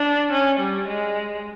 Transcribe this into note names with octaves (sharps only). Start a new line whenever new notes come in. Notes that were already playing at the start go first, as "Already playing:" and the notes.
Already playing: D4
C#4
G3
G#3